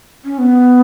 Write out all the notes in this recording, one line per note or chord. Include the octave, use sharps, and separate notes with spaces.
C#4
B3